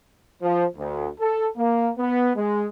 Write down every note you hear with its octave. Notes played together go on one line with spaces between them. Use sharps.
F3
D2
A4
A#3
B3
G#3